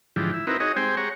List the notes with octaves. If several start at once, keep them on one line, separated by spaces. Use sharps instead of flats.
G#2 D3 E3 F3 G4
E4
C4 D#4 E4 F#4 A#4 B4
D#4 F#4 G#4 C#5 D#5
G#3 C4 G4 C5 G5 G#5
G4 G#4 C#5 F#5 A#5 C#6